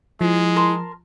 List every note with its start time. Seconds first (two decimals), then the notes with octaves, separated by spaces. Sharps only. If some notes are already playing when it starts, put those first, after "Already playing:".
0.21 F3 G#3 E4
0.56 A#4 A5 C6